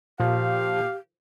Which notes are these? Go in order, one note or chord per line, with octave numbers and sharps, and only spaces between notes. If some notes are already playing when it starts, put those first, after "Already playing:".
A#2 F3 G4 F5